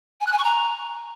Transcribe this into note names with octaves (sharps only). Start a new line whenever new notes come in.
G#5
F#6
G#5
C#6
A#5